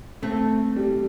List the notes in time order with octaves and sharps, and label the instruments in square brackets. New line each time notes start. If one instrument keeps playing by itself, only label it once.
[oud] A3 [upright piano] C4
[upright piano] G3